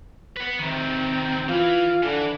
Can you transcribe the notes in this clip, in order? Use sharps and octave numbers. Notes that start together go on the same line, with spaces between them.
B4 F#5
C3 D#3 C4
E3 F4
D3 E3